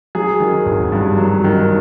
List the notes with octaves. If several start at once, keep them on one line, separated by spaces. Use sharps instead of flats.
F#3 G#4
D#3
G#1
G2
F#3
D#3